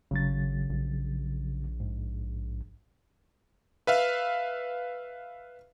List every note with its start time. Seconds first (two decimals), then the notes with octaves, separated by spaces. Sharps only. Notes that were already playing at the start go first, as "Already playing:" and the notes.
0.11 G#1 C#3 F#3 A6
0.70 A#1
1.80 G#2
3.87 B4 E5 F5